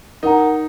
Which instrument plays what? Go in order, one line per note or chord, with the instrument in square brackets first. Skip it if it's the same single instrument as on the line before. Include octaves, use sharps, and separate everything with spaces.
[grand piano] D#4 [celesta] A#4 F#5 A#5